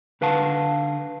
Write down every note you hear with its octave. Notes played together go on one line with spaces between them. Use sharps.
D3 B4 F5 F#5 A5